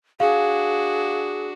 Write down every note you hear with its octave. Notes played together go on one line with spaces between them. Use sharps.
D4 F#4 G#4 F5